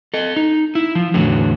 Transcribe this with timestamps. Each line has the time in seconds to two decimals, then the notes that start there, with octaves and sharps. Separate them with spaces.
0.14 A4 D#5
0.36 D#4
0.75 E4
0.95 F3
1.14 E2 A2 D3 F#3